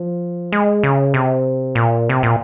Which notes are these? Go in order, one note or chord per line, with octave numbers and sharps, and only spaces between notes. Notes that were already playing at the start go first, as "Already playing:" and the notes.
Already playing: F3
G#3
C#3
C3
A#2
C3
A#2